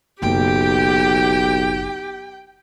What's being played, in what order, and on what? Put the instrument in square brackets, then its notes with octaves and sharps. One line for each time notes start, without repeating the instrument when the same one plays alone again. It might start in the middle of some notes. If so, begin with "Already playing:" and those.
[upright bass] F#1 [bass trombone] B1 [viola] G4 [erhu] G5